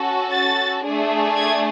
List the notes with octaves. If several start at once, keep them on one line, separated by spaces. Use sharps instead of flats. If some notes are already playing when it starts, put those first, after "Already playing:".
Already playing: C#4 F#4 A4
A6
A3 D4 G#4
G#6